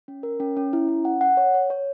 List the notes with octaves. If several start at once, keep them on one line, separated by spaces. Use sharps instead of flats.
C#4
A#4
C#4
C#4
E4
C#4
F#5
F#5
C#5
C#5
C#5